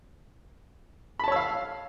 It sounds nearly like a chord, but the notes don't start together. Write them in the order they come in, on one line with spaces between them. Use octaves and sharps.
B5 A5 C#5 E6 F5